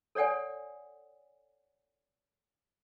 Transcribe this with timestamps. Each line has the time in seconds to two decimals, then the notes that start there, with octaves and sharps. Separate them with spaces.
0.15 A4 C#5 D5 F#5 G#5